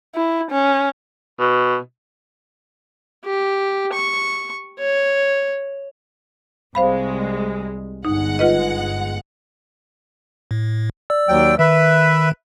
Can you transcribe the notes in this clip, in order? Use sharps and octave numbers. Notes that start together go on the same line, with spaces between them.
E4
C#4
B2
G4
C#6
C#5
C2 G#3 C5 F5 B5
G1 G#3 D#4 F#5
F4 B4 D#5
A2
D5 E6
D#2 F#3 G5
D#3 B4 E5